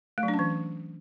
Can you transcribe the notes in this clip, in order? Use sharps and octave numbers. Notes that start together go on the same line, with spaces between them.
A3
F#3
D4
C#4
E3